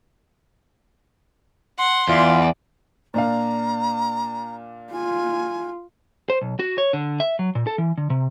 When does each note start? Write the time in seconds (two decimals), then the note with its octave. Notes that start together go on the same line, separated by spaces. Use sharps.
1.79 F#5 C6
2.09 E2 F4 D5
3.14 A#2 D4 F5 A#5
4.93 F4 G#5
6.30 C5
6.41 B1
6.59 F#4
6.78 C#5
6.93 D3
7.20 E5
7.39 F#3
7.55 A#2
7.67 A4
7.78 E3
7.97 D3
8.10 C3